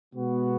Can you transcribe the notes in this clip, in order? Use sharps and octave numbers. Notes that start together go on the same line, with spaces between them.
B2 G#3 B3 F#4